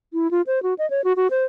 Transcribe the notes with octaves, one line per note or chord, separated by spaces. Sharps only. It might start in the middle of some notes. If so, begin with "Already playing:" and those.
E4
F4
C5
F#4
D#5
C#5
F#4
F#4
C5